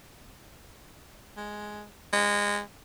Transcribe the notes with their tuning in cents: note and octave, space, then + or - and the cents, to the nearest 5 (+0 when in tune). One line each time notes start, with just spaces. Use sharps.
G#3 +5
G#3 -20